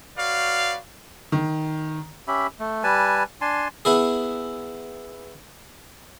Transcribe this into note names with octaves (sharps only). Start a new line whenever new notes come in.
F#4 B4 C#5 D5 F5
D#3
C#4 G4 E5 B5
A3
G3 B4 G#5 A5
D4 G#5 A5 C6
B3 E4 G#4